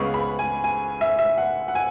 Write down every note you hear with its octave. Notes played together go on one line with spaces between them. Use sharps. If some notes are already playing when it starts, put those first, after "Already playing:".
Already playing: C#2 C#3 G#3 B3 C#6
B5
G#5
G#5
E5
E5
F#5
F#5
G#5